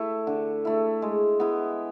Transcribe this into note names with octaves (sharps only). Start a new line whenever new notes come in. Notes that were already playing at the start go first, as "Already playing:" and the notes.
Already playing: A3 E4
D3
A3 E4
G#3
B3 E4